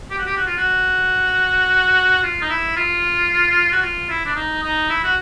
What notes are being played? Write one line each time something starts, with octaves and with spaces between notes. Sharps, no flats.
G4
F#4
G4
F#4
F4
F#4
F4
D#4
E4
F4
F#4
F4
E4
D4
D#4
D#4
E4
F#4